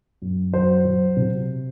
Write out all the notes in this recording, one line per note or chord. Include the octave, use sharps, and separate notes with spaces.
F#2
F#3 C5
F#3
C3